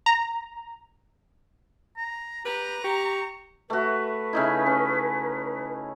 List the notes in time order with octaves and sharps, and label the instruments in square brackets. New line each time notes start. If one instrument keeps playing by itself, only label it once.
[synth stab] A#5
[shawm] A#5
[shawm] G4 [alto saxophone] B4 [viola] A#5
[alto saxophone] G4 [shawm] C#6
[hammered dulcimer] A3 F#4 [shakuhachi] B4
[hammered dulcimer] C#3 D#4 E4
C#4